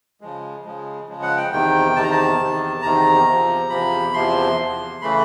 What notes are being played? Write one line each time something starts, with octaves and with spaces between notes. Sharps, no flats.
C#3 F3 G#3
C#3 F3 G#3
C#3 F3 G#3
F#5
G5
E2 C3 D#3 G5
E2 C3 D#3 A5
A#5
A5
E2 C3 D#3
E2 C3 D#3 A#5
E2 C3 F3
E2 C3 F3 B5
E2 C3 F3 C6
E2 C3 F3
C#3 E3 A3 B5